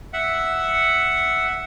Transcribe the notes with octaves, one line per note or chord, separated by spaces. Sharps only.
E5 F#5